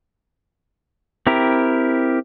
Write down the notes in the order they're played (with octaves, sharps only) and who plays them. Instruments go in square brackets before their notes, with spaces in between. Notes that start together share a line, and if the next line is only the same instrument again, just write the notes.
[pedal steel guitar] C4 E4 G4 A#4